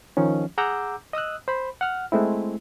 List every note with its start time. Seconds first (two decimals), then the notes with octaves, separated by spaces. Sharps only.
0.17 D#3 F3 C#4
0.58 G#4 F#5 A#5 D6 E6 G6
1.13 D#5 D#6 E6 F#6
1.48 C5 B5
1.81 F#5 F6
2.12 G#3 A3 C4 E4